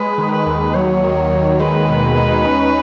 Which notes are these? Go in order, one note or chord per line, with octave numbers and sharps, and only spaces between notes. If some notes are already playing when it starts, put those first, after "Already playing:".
Already playing: G#3 B4
D#3
B4
D#2
F#3 C#5
D#3
D#2
G#3 B4
B2
D#4
C#4